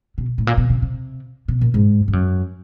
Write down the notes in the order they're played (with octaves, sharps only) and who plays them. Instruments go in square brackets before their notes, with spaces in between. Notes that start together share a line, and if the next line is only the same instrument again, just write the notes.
[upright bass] B2
A2
A#2
B2
C3
C3
B2
A#2
G#2
G2
F#2